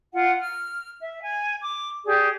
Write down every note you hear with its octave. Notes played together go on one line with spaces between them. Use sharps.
F4 F#5
F6
E5
G#5
D6
G4 G#4 D5